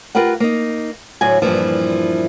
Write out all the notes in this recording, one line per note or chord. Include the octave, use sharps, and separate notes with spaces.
F4 G4 A#4 B4 F#5
A#3 D#4
D2 A2 F#3 G#5
G2 A#2 E3 F3